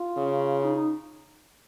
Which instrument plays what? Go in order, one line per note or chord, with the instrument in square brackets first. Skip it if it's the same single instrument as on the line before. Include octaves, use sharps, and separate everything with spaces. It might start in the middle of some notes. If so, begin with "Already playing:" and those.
Already playing: [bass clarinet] F4
[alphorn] C#3
[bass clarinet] D#4
D#4